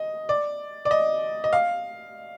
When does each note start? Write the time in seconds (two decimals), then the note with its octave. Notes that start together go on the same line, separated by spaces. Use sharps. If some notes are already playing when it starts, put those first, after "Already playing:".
Already playing: D#5
0.29 D5
0.85 D5
0.91 D#5
1.44 D#5
1.53 F5